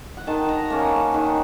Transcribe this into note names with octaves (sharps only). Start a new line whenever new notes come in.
F#5
D#3 A5
A#5
A#3 C#4 A5
D#3 F#5